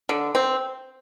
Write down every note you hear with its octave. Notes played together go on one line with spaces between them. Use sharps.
D3
C4